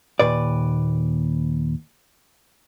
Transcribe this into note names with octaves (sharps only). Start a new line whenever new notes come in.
D#2 A#2 B4 D5